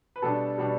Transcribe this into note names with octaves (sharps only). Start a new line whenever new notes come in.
B4
B2 G3 D4 A4
B2 G3 D4